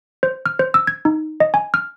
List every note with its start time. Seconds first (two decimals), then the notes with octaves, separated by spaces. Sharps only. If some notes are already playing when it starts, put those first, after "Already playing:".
0.23 C5
0.46 F6
0.59 C5
0.74 E6
0.87 G#6
1.05 D#4
1.40 D#5
1.54 G#5
1.74 F6